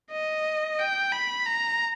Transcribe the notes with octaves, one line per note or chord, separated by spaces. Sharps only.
D#5
G5
B5
A#5